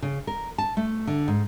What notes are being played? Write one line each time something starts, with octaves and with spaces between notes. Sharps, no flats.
C#3
A#4
A5
A3
D3
G#2